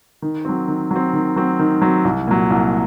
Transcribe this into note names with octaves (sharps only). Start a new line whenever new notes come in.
D#3
F#3 C4
D#3
F#3 C4
D#3
F#3 C4
D#3
F#3 C4
C2
A#2 F#3
C2